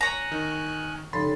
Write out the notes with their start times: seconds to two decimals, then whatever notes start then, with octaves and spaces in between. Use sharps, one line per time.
0.01 C#5 G#5 A#5 F#6
0.32 D#3
1.13 F1 C#3 B5 C6 A6